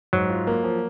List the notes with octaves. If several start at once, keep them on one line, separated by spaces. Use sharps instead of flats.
G#2 F#3
F4
A#3
F3